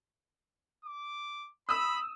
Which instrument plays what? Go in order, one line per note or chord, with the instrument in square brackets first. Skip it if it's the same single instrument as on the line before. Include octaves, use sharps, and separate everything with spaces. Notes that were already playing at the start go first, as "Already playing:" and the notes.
[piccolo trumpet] D6
[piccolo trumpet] B5 [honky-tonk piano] D#6 E6